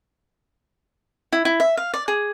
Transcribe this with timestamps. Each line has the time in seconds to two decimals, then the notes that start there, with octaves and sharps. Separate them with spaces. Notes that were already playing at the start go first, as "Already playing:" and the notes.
1.32 E4
1.45 E4
1.60 E5
1.77 F5
1.94 D5
2.08 G#4